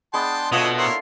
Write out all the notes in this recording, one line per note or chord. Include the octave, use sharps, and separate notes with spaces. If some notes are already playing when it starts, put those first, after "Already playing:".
G#3 B3 D4 G5 A5 C6
B2 A3 F4 C#5 D#5 E5 D#6
E4 A#4 C#5 C6